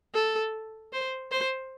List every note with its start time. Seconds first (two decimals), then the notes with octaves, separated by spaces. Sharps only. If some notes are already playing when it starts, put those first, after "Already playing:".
0.14 A4
0.93 C5
1.31 C5